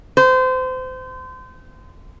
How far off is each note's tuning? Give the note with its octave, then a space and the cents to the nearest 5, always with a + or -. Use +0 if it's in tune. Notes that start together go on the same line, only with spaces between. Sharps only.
C5 -30